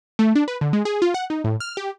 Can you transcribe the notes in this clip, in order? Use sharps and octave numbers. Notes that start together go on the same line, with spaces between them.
A3
D4
B4
D3
G#3
G#4
F4
F#5
D#4
A2
F6
G4